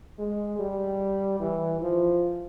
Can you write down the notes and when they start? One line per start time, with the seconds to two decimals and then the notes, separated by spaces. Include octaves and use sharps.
0.19 G#3
0.59 G3
1.40 E3
1.81 F3